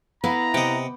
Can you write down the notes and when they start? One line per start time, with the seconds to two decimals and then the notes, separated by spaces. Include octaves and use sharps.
0.24 B3 E4 B4 F5 A#5
0.54 C3 D#5 F#5 G5 D6